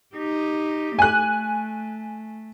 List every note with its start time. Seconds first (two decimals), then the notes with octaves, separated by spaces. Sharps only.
0.15 D#4 G4
0.99 A3 G#5 F#6